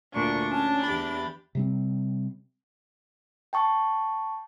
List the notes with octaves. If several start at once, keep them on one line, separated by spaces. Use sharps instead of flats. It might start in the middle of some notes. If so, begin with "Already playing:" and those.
D2 A#2 D4 C#6
C#4 A5
E2 G4 B5 A6
C3 G3 C4
G5 A5 C#6